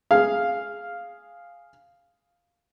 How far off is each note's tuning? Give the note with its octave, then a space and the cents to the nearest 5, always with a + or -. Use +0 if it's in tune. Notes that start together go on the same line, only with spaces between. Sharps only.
G#4 +0 F5 +0